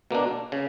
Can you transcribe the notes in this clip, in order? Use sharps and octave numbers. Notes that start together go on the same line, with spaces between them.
B2 A#3 D4
C#3